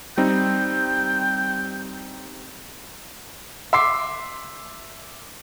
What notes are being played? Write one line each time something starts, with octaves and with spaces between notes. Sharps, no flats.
G3 C4 D#4 G5
E5 C6 D6 C7